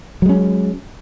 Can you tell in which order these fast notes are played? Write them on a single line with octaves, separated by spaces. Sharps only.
F#3 G#3 C#4